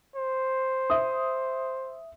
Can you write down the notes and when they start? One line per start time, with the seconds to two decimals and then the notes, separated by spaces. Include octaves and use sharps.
0.16 C5
0.90 E5 D#6